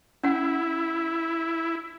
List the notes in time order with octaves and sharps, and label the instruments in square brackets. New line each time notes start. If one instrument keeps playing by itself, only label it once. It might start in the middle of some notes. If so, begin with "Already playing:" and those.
[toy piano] C#4 F#5 [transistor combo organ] E4